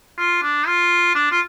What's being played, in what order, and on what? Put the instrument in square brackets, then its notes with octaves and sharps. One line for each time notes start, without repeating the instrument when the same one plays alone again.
[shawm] F4
D4
F4
D4
F4